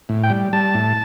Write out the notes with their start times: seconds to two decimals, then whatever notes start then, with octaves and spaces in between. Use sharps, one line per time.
0.09 A2
0.23 G5
0.30 G3
0.53 G3 A5
0.75 A2